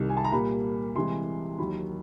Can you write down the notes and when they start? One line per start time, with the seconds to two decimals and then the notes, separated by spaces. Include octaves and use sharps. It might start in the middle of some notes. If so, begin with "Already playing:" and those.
Already playing: C2 C3 D#3
0.09 G#5
0.17 A5
0.24 A#5
0.32 A#2 G3 A#3 B5
0.96 C2 C3 E3 G#3 C6
1.58 D#2 D#3 F#3 B5